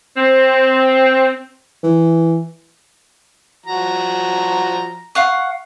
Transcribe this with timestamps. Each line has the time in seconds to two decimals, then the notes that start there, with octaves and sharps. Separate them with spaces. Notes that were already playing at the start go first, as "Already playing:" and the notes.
0.17 C4
1.83 E3
3.66 F3 F#4 A#5
5.15 F5 F#5 C#6